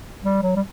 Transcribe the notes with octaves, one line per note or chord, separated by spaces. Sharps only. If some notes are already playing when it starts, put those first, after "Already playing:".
G3
F#3
G3